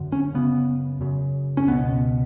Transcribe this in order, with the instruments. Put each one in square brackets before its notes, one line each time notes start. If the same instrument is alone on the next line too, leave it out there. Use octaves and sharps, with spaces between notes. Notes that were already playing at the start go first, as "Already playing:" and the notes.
Already playing: [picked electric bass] F#2 D3
C#4
F#2 C#3 B3
F#2 C#3
C#4
C#2 B3
B2